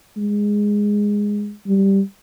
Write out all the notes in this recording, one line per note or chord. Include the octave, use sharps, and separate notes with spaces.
G#3
G3